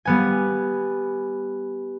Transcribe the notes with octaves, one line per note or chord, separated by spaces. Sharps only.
G3 B3 G#5